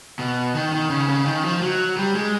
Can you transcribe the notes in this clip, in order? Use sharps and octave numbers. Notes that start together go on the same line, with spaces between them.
B2
D#3
D#3
C#3
C#3
D#3
F3
F#3
G3
G#3